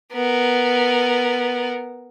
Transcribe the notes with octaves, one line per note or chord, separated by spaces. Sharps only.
B3 A#4